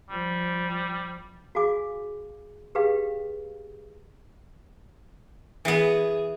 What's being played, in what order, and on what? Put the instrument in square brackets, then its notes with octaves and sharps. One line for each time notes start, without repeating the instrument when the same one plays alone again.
[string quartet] F3 [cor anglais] G3
[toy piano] F#4 G#4 F5 G#5 D6
G4 G#4 B4 F5 G5
[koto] E3 B3 [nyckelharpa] G#4